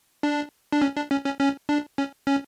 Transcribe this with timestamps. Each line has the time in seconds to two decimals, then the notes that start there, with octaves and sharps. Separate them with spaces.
0.23 D4
0.72 D4
0.82 C#4
0.96 D4
1.11 C#4
1.25 C#4
1.40 C#4
1.69 D4
1.98 C#4
2.27 C#4